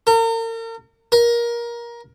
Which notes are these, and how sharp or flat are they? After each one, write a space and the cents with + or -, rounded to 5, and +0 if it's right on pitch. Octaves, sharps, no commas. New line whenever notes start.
A#4 -40
A#4 +20